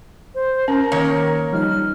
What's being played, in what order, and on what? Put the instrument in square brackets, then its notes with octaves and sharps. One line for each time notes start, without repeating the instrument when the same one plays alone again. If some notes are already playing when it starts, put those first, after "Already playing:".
[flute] C5
[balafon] C#4 [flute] A#4
[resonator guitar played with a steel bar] D#3 A#3 C#5
[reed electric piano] F3 G3 D#4 [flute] F6